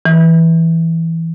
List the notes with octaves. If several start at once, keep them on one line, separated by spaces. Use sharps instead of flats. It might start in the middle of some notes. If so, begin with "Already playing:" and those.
E3